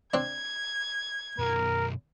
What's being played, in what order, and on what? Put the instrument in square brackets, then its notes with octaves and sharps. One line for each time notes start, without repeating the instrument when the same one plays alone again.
[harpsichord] C4 D4 [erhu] G#6
[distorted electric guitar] F#2 B2 [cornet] A#4